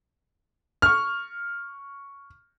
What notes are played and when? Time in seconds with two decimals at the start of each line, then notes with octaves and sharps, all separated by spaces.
0.82 C#6 F6